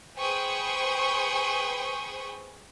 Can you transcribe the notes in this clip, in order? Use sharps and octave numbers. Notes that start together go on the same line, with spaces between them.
G#4 B4 C5 G5 C#6 D#6